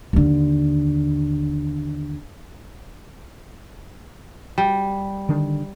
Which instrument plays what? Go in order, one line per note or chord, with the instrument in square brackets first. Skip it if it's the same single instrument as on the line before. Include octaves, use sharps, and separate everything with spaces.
[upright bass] D#2 D3
[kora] G3
[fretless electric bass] D3 D#3 D4